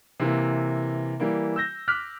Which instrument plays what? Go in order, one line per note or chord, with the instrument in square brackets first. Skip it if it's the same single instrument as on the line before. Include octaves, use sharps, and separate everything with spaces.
[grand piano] C3 E3 A#3
E3 G3 A#3
E6 G6 A#6
D6 F6 F#6 B6